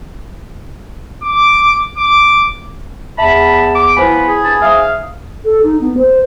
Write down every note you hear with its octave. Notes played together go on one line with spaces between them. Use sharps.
D6
D6
E2 E5 A5 B5
D6
B2 F3 B3 E4 C5 G#5 B5
G#4
E2 G2 A5 B5
G#2 E5 F5 D#6
A4
D#4
B3
C5